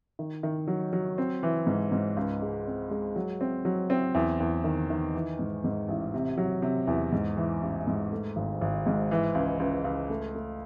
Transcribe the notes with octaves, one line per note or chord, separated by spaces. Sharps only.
D#3
D#3
F#3
F#3
C4
E3
G#2
G#2
C#2
G#3
C4
G#3
F#3
C4
F#3
C4
E2
E2
D#3
D#3
E3
G#2
G#2
A1
C3
F#3
C3
E2
G#2
E3
A1
G#2
A3
G#1
G#1
G#2
E3
C#2
C#2
C#2
A3
A3